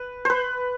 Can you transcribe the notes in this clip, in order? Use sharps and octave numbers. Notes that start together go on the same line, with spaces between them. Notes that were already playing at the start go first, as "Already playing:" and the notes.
Already playing: B4
B4 C5